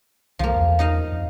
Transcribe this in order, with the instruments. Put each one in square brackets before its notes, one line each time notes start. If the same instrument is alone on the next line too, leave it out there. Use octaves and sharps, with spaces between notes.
[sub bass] C2 [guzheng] F3 A#3
[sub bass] E2
[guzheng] D#4 D#5 F5
[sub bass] F2